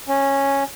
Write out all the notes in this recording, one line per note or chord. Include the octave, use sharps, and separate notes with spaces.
C#4